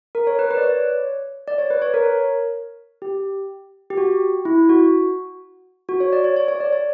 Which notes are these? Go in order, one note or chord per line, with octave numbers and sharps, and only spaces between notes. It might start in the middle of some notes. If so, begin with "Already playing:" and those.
A#4
C#5
B4
B4
D5
C#5
D5
C#5
B4
C#5
A#4
G4
G4
F#4
E4
F#4
F#4
C#5
D5
C#5
C#5
C#5
D5
C#5